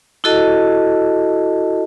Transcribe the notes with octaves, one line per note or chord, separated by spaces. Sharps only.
E4 F#4 A4 D#5 A5